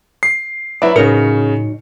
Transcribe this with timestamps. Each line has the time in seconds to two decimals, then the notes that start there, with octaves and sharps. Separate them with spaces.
0.23 C7
0.82 F#3 E4 B4 C#5 D5 E5
0.96 A2 C#3 F#3 D#4 A#4 C#7